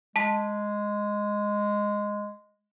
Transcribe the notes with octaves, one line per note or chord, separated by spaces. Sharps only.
G#3 A5 B6